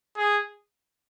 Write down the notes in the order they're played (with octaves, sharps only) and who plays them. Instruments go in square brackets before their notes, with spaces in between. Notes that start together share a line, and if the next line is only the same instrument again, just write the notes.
[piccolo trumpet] G#4